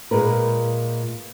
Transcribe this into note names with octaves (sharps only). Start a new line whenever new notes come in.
A#2 G#3 A#4 B4